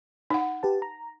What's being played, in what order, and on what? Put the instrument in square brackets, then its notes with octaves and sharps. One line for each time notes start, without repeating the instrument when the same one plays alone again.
[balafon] D#4 F#5
[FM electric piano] G4 B4 A5
A#5